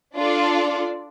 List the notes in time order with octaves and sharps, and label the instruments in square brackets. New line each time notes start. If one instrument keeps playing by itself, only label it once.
[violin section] D4 F4 A4 D5